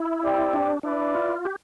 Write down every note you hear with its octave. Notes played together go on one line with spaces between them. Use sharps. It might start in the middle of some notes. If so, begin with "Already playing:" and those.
Already playing: E4
C4 G4 D5 G5
D4
D4 E4 B4 D5
F4
G4